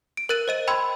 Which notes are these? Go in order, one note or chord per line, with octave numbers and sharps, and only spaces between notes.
D7
A#4 F#6 A6 D#7
C5 D#5 D#7
G5 B5 C6 E6 G#6